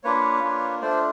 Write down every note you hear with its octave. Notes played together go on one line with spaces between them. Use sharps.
A#3 D4 F4 B4 C#5
A#3 D4 F4
A3 D4 F4 C5 D5